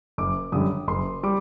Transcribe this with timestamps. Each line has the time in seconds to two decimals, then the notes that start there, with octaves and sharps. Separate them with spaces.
0.18 F#1 D6
0.52 F#2 D3 G3 D#6
0.88 F#1 C6
1.23 G3 D6